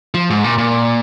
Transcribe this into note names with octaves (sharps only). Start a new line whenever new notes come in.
F3
G#2
A#2
A#2